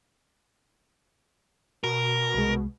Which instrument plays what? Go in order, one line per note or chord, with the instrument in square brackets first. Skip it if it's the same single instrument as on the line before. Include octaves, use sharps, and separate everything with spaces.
[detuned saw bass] B2 [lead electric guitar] A#4
[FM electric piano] C2 G#3